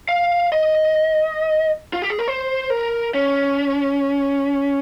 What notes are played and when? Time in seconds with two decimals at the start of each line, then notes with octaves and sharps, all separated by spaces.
0.09 F5
0.52 D#5
1.93 F4
2.02 G4
2.10 G#4
2.19 A#4
2.28 C5
2.70 A#4
3.14 C#4